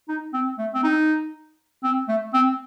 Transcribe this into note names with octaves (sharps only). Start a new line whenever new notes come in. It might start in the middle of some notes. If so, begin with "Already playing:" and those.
D#4
C4
A3
C4
D#4
C4
A3
C4